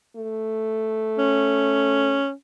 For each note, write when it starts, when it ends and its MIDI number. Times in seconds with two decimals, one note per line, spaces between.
0.17 2.24 57
1.18 2.32 61